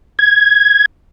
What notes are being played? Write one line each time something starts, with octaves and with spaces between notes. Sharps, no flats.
G#6